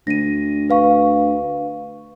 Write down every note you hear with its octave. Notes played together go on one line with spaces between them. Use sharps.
D2 A#6 D#7
B4 F5 C#6